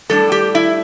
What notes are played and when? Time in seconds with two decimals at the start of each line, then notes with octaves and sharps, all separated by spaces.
0.09 A2 G3 D4 A4
0.32 G4
0.55 E4